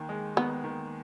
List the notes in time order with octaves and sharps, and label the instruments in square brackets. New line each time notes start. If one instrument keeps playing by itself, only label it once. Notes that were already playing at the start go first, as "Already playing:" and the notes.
Already playing: [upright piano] D#2 D#3
G#3
[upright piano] D#3 [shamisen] B3
[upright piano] D#3